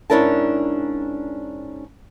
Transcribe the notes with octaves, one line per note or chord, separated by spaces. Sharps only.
G#2 C#4 D4 E4 A#4 A5